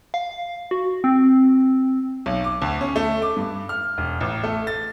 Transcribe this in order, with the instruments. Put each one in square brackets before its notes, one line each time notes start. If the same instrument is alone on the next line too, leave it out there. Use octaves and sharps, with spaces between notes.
[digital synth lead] F5
F#4
C4
[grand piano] B1
D6
D2
C#4
A3
D6
G2
F6
E1
A1
A3
A6